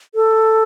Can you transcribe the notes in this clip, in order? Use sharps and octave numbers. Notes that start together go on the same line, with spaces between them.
A4